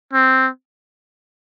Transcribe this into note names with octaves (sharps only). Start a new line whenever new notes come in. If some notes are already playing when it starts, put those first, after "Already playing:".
C4